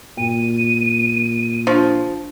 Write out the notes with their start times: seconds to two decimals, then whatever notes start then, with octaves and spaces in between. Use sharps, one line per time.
0.17 G2 A#2 D#7
1.67 F3 D4